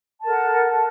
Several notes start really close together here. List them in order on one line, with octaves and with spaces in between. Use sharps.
A5 A#4 A4 F#5